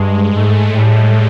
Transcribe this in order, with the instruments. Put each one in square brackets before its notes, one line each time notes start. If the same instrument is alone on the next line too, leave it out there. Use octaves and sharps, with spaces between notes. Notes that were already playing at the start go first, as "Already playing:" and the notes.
Already playing: [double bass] G2 [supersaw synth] G#3
[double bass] G#2 [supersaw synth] A3
[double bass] A2 [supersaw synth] G3